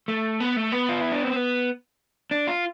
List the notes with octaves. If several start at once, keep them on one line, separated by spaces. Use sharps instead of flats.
A3
B3
A3
B3
F4
E4
D4
C4
B3
D4
F4